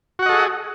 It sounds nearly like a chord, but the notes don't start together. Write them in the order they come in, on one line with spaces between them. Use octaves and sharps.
F#4 F#5 D#5 A4 G#4